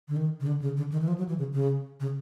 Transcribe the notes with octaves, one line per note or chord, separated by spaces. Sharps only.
D3
D#3
C#3
D3
C#3
D3
D#3
E3
F3
F#3
E3
C#3
C#3
C#3